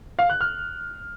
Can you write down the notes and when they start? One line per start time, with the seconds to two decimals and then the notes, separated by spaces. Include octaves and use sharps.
0.19 F5
0.30 F#6
0.41 F6